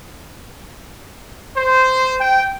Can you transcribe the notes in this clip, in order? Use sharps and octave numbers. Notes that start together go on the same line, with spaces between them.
C5
G5